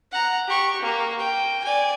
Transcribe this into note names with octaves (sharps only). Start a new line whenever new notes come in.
F#5 A#5
G4 C#6
A#3
G5
D5 G#5